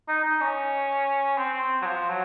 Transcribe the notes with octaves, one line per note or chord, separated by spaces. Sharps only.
D#4
D#4
C#4
C4
C4
F#3
F3
F#3